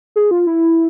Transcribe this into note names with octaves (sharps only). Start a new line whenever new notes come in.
G#4
F4
E4